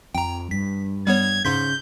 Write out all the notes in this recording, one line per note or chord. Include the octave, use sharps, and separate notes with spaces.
F2 G5 A#5
G2 B6
G3 B3 C#5 G#6
G#2 C#3 C6 G6 B6